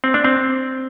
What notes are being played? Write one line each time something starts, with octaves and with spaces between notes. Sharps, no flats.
C4
D4
C4